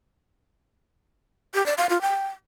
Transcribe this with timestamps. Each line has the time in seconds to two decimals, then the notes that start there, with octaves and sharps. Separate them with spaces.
1.54 G4
1.66 D5
1.78 F5
1.90 F4
2.01 G5